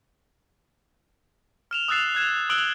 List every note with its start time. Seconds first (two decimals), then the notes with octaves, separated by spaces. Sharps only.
1.71 F6 E7 F7
1.88 D#6 E6 F#6 A6 C7 E7
2.15 F#6 G#6 E7
2.50 D#6 E6 F#6 D7 F#7 G7